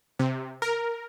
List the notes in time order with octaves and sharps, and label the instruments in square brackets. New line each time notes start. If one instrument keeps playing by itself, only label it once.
[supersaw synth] C3
A#4